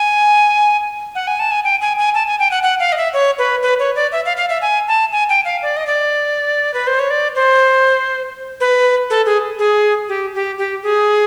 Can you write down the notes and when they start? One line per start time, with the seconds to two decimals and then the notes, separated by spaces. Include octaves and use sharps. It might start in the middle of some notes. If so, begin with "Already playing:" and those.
Already playing: G#5
1.15 F#5
1.27 G#5
1.40 A5
1.51 G#5
1.64 G5
1.81 G#5
1.98 G#5
2.15 A5
2.27 G#5
2.39 G5
2.51 F#5
2.63 F#5
2.80 F5
2.92 D#5
2.97 E5
3.14 C#5
3.39 B4
3.62 B4
3.80 C#5
3.96 D5
4.12 E5
4.26 F5
4.37 F5
4.49 E5
4.62 G#5
4.88 A5
5.12 G#5
5.29 G5
5.45 F5
5.62 D5
5.77 D#5
5.87 D5
6.74 B4
6.87 C5
6.99 C#5
7.10 D5
7.35 C5
8.60 B4
9.10 A4
9.26 G#4
9.59 G#4
10.09 G4
10.34 G4
10.58 G4
10.83 G#4